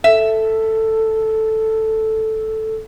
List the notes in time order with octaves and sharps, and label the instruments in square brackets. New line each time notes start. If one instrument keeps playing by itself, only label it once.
[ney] A4 [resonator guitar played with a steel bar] E5